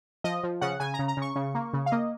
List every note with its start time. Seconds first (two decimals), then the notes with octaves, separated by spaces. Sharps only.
0.24 F3 D#5
0.44 F3
0.61 C#3 F#5
0.80 C#3 G#5
0.94 A#5
0.99 C#3
1.08 A#5
1.17 C#3 C#6
1.36 C#3
1.55 A#3
1.74 C#3
1.86 F5
1.92 A#3 D#5